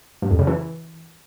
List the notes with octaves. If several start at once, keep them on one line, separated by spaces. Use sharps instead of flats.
G2
F2
C#3
E3